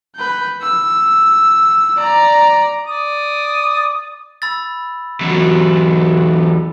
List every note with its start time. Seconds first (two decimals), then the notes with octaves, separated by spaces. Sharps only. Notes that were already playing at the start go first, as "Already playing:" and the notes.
0.16 B4 G6
0.62 E6
1.97 D5 A#5
2.86 D5 D#6
4.42 B5 E6 A6
5.21 E2 F#3